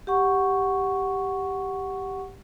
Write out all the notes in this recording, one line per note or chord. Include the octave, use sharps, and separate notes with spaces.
G4 F#5 C#6